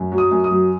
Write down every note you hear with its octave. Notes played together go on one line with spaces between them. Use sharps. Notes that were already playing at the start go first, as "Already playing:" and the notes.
Already playing: F#2
F#3
D#6
F#2
D#6
F#3